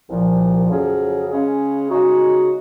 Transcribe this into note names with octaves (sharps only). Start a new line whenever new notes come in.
C2 A#2 F3
F2 C#3 F#3 C#4 G#4
C#3 G#3 C#4 G#4
C#3 G#3 D#4 F#4